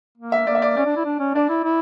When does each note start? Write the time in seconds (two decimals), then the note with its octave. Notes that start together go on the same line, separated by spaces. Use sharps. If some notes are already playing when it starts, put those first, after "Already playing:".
0.18 A#3
0.32 E5
0.47 A#3 D5
0.55 E5
0.62 D5
0.77 C#4 D5
0.86 D4
0.97 E4
1.06 D4
1.20 C#4
1.34 D4 D5
1.49 E4
1.64 E4